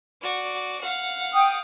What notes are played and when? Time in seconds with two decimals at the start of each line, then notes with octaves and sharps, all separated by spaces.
0.21 F#4 D5
0.81 F5 F#5
1.33 G5 D#6